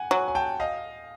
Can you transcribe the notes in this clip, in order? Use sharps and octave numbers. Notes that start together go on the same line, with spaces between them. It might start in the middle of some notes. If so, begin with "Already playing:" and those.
Already playing: F#5 G#5
F#3 F#5 G#5
G#5
G5 A5
D#5 F5